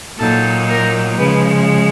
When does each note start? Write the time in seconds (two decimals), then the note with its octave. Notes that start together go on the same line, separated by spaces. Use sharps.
0.19 A#2 F#3 A#3 D#4 A4
0.69 A#4
1.18 C#3 F3 G#3 B4